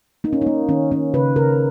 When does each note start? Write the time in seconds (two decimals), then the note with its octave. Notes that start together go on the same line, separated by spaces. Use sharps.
0.24 A#3 D#4
0.33 C#4
0.42 A#3 D#4
0.69 D#3 C#4
0.92 A#3 C#4
1.14 C#3 B4
1.36 C#3 A#4